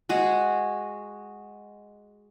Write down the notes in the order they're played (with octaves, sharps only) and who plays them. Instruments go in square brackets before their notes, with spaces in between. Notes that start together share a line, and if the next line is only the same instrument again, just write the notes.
[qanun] G#3 F#4 G#4